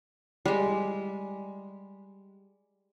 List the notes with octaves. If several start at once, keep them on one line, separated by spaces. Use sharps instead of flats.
G3 G#3